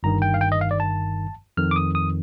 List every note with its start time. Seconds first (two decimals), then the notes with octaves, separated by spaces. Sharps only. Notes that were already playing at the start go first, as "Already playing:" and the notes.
0.03 G1 G2 D#3 A#5
0.22 G5
0.34 F5
0.41 G5
0.52 D#5
0.61 F5
0.71 D5
0.80 A5
1.57 F2 D#3 F6
1.71 D6
1.76 D#6
1.95 D#6